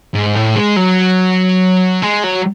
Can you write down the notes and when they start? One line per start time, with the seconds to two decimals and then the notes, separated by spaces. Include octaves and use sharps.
0.14 G#2
0.35 A2
0.56 G#3
0.76 F#3
2.02 G#3
2.23 F#3